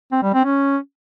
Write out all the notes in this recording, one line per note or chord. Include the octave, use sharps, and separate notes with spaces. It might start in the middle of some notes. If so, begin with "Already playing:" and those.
C4
G3
C4
C#4